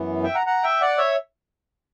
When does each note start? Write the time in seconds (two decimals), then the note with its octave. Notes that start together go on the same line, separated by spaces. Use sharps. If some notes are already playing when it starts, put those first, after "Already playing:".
Already playing: F#2 E3 B3
0.23 E5 G5
0.34 F#5 A#5
0.46 F#5 A#5
0.63 E5 G5
0.81 D5 F#5
0.98 C#5 E5